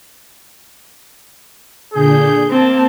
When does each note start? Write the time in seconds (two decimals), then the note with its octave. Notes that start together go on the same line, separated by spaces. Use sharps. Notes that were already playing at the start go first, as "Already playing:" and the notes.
1.94 A#2 D3 G#4 G6
2.50 A#3 C4 A5